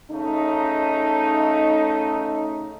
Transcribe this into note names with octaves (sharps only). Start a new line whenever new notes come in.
C#3 A3 D#4